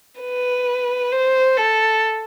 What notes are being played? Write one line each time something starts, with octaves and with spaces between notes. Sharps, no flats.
B4
C5
A4